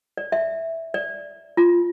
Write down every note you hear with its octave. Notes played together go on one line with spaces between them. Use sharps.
D5
E5
D5
F4